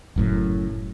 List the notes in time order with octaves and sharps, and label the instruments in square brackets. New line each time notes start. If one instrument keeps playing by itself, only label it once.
[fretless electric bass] F#1 F#2 A2